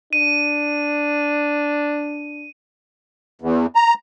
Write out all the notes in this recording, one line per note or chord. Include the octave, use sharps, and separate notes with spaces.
D4 D#7
E2
A#5